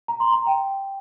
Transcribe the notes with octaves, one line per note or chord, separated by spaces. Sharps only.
A#5
C6
A#5
G5